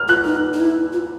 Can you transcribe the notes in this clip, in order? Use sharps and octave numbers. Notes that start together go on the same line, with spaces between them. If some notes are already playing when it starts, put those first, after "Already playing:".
Already playing: F6
F4 F#6
D#4
D#4
E4
F4